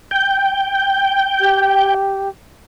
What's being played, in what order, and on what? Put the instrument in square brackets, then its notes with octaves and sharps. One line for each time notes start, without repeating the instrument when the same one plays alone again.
[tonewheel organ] G5
[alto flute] G4